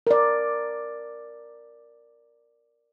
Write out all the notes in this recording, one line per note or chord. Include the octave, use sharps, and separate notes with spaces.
A#4 D5